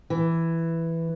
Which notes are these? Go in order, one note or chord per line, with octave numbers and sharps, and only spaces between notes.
E3